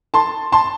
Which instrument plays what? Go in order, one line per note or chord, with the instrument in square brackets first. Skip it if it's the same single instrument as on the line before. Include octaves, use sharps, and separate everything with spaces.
[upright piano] A5 C6
A5 C6